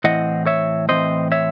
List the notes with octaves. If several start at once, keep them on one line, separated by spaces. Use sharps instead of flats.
A2 E3 C4 D#5 F#5
C#5 E5
A2 E3 C4 C5 D#5
C#5 E5